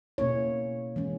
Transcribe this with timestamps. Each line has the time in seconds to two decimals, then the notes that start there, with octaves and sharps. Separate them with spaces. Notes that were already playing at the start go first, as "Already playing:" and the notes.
0.18 B2 A#3 C#4 E4 C#5
0.96 E3 G#3 C#4